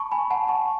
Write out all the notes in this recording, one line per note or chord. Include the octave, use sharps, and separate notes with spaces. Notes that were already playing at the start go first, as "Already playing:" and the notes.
Already playing: A5 B5 C#6
G#5 B5
F#5 A5
A5 C#6